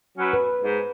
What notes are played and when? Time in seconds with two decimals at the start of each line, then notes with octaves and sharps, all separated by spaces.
0.18 F#3 C#4 B4
0.33 B4
0.62 G#2